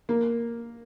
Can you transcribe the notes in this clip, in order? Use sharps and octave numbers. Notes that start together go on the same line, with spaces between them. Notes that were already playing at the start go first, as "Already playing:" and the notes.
A#3